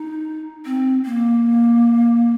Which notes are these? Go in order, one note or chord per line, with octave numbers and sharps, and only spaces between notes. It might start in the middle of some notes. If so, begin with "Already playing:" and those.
Already playing: D#4
C4
A#3